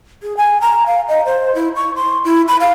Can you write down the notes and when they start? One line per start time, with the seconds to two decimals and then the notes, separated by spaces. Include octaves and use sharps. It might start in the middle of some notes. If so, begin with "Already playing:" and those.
0.23 G#4
0.37 G#5
0.61 A#5
0.86 F5
1.08 D#5
1.25 C5
1.55 E4
1.76 C#6
1.96 C6
2.24 E4
2.48 B5
2.60 F5